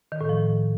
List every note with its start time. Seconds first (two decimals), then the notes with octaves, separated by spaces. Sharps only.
0.12 D#3
0.21 A2
0.29 F3